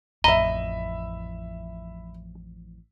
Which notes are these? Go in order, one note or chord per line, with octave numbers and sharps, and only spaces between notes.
A1 F2 D#5 E5 A#5 B5